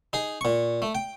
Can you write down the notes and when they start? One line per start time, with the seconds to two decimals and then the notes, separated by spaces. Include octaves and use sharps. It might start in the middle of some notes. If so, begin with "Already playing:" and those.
0.13 D#4 G#4
0.41 A#2 C#6
0.82 A3
0.95 G5